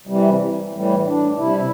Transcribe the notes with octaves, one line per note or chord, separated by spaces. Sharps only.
C3 E3 G3
A2 E3 G3
D4
C3 G3 E4